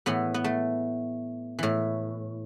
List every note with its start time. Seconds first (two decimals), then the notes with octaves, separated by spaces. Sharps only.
0.06 A2 E3 B3
0.34 B3
0.44 A3
1.59 A2 E3